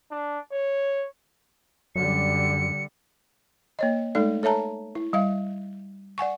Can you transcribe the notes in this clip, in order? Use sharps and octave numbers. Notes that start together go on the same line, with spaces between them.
D4
C#5
F#2 D3 G3 C#7
A#3 C#5 D#5
G#3 A3 D#4 A4 D5
A4 C#5 E5 A5 A#5
E4
G3 E5 F5
D5 F#5 G#5 C#6